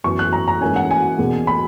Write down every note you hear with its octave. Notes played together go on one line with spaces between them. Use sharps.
F#2 E3 B3 C#6
F#6
A#5
A#5
G#2 E3 A#3 C#4 G#5
F#5
G#5
E2 B2 A#3
B5